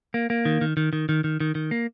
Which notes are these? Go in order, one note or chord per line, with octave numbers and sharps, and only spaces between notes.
A#3
A#3
D#3
D#3
D#3
D#3
D#3
D#3
D#3
D#3
A#3